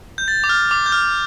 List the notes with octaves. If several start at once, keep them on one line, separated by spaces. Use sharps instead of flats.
G6
A6
D6
F6
D6
G6
F6